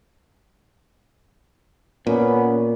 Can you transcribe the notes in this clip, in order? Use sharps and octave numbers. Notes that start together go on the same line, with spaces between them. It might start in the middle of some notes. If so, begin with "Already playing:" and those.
A#2 B3 C#4